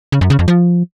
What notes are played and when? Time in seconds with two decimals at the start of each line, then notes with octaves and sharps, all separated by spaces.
0.12 C#3
0.21 F#2
0.30 C#3
0.39 F2
0.48 F3